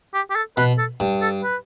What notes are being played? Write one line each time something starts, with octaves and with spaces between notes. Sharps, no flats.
G4
G4
A4
B2 B4
A4
G2
A4
B4